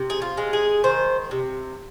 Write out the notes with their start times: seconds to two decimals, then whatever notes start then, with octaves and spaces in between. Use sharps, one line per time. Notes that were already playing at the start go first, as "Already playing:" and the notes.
Already playing: C3
0.10 G#4
0.22 F4
0.37 G#3
0.53 G#4
0.84 D#3 C5
1.31 C3